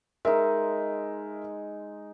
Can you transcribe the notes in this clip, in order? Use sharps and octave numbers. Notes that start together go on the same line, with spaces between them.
G#3 D#4 A#4 E5